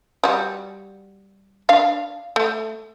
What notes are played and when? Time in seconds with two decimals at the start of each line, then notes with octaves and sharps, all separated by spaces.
0.24 G3 F#4
1.69 D4 F5
2.36 A3